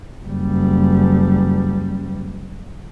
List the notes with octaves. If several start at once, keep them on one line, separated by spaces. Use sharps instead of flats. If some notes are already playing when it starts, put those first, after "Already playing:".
F#1 G3